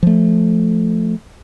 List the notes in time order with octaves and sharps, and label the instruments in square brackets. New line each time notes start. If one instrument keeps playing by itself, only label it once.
[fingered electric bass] F3 A3